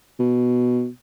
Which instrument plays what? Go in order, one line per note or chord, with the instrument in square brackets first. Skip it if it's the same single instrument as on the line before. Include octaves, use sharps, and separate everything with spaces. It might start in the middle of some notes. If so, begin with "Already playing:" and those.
[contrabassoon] B2